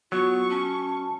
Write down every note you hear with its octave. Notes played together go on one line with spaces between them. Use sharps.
F#3 B3 F4 C#6
C#4 A5